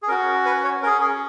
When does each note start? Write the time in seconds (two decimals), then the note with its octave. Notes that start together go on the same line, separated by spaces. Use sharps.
0.03 G#4
0.08 C#4 A#4
0.11 F#4
0.45 B4
0.64 C#5
0.82 C#4 A#4
0.86 G#4
1.01 G#4